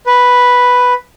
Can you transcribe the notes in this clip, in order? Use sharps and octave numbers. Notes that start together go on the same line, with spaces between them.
B4